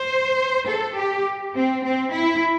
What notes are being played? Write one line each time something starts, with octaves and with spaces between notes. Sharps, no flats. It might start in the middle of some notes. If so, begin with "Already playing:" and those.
Already playing: C5
A4
G4
C4
C4
E4